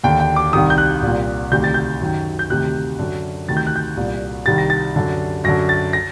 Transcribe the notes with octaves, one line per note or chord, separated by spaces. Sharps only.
D#2 D3 G5
G5
D6
C2 C3 D#3 D#6
G6
F#6
C2 A#2
D2 C3 D#3 G6
A6
G6
F#2 D#3
G6
D2 C3 D#3 F#6
F#2 D3
D2 C3 D#3 A6
G6
F#6
G6
C2 A#2
C2 C3 D#3 A6
A#6
A6
F#2 D3
F#2 D3 A#6
A6
A#6